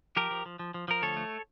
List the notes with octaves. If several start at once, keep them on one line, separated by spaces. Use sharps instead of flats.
F3 G4 A#4
F3
F3
F3
F3
F3 A#4
D2 A4 C#5
A3